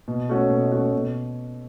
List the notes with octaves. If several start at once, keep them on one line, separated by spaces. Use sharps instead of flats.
B2
A3 C#4 F#4
B2
A3 C#4 F#4
B2